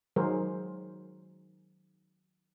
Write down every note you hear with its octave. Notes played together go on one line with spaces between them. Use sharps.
D#3 F#3 G#3 G#4 A#4 C5